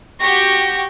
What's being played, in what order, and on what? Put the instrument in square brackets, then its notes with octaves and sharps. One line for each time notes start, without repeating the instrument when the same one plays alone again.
[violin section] F#4 G4 C#6 [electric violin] A#6